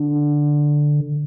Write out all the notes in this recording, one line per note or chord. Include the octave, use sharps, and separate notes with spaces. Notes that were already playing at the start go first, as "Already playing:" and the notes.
Already playing: D3